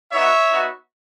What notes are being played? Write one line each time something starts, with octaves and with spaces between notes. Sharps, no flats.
B3 D#4 F#4 C#5 E5
B3 D#4 F#4